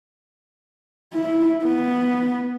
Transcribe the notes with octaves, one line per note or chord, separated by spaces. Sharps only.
E4
B3